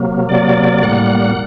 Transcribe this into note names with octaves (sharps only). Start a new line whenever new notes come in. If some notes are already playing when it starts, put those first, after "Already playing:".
Already playing: C3 F#3 A#3
C3 F#3 A#3 D5
A2 G3 A#3 F#5